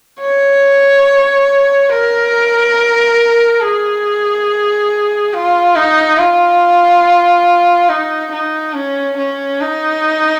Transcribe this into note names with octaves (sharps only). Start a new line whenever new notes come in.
C#5
A#4
G#4
F4
D#4
F4
D#4
D#4
C#4
C#4
D#4